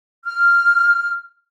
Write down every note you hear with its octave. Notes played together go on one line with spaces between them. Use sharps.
F6